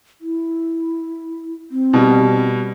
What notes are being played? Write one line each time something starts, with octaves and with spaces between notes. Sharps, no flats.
E4
C4
B2 G3